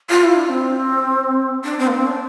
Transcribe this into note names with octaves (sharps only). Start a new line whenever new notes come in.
F4
E4
D4
C4
D4
C4
A#3
C4
D4